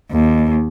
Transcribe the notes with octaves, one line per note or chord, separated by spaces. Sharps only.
D#2